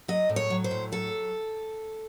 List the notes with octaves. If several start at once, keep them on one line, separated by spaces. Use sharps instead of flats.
F#3 D#5
A2
C#5
F#3
C5
A2
F#3 A4